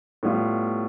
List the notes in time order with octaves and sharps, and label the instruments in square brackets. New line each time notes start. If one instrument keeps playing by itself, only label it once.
[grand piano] A2 G3 B3 F4